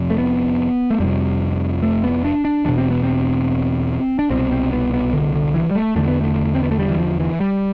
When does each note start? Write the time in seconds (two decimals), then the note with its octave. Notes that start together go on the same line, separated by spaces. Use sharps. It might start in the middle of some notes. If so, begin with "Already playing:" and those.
Already playing: F2 C3
0.10 A3
0.18 B3
0.90 A3
1.00 F2 C3 G3
1.83 A3
2.04 B3
2.24 D4
2.45 D4
2.65 E2 B2 D4
2.78 C4
2.91 B3
3.03 C4
4.19 D4
4.30 C2 B2 C4
4.52 C4
4.72 B3
4.93 B3
5.13 D3
5.35 D3
5.54 E3
5.71 G3
5.75 A3
5.96 E2 D3 A3
6.08 B3
6.21 A3
6.55 C4
6.63 B3
6.71 A3
6.79 G3
6.90 E3
6.99 F3
7.20 E3
7.40 G3